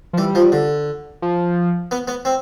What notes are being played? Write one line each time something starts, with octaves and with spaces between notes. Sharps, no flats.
F3
E3 G3
F3
D3
F3
B3
B3
C4